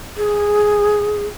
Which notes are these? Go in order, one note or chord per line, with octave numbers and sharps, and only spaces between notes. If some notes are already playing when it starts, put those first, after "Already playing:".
G#4